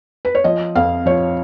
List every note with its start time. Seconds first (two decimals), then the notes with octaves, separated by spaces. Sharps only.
0.25 B4
0.35 C#5
0.44 F3 D#5
0.75 F2 F5
1.06 F3 C#5